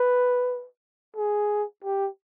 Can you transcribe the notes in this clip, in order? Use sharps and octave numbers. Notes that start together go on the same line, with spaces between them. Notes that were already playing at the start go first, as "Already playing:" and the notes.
Already playing: B4
G#4
G4